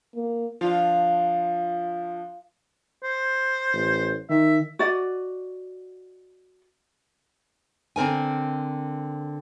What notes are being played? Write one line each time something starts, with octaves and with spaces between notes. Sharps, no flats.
A#3
F3 D4 F4
C5
A1
D#3 E5
F#4 D5 D#5
D3 C4 A#4 G#5